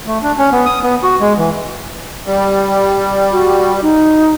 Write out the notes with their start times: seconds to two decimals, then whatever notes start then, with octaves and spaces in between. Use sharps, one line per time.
0.07 A3
0.23 D4
0.38 C#4
0.52 B3
0.66 D#6
0.83 B3
1.03 F#4
1.20 G#3
1.38 E3
2.26 G3
3.32 F#4
3.82 D#4